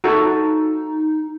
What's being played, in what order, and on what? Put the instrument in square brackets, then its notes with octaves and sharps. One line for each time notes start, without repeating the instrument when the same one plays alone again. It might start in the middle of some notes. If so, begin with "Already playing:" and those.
[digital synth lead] D#4 [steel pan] F#4 A4